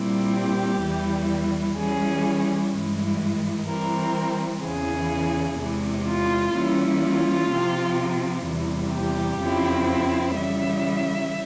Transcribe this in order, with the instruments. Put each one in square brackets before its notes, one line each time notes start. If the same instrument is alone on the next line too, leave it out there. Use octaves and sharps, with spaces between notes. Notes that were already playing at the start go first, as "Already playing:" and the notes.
Already playing: [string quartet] A#2 G3 C4 E4
G4
E2 E3 G3
E3 G3 C#4 G#4
G2 E3 G#3
E3 G3 C4 A#4
E2 C#3 E3 G#4
E2 C3 E3 G#3
F4
E3 G3 A#3 C#4 E4
F4
C3 F3 C4
E2 C3 E3 G3
G4
F2 C#3 F3 C4 E4
C#3 E3 G3 E5